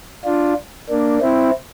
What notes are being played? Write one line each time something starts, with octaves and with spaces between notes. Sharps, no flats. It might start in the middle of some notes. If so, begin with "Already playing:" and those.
D4 F4
A#3 D4
C4 E4